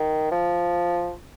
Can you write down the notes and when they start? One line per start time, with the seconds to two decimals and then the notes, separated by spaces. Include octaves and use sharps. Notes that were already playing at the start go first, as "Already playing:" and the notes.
Already playing: D#3
0.31 F3